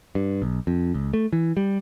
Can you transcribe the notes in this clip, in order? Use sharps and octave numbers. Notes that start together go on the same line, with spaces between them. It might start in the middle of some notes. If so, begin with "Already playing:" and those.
G2
B1
F2
C#2
A3
E3
G3